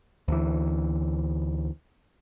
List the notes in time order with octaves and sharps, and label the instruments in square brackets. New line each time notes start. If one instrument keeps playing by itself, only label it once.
[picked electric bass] D2 E3